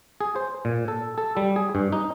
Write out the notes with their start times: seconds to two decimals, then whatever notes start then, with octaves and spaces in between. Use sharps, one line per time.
0.21 G#4
0.36 C5
0.65 A#2
0.88 A4
1.18 A4
1.37 G3
1.56 G#4
1.75 G2
1.92 D#4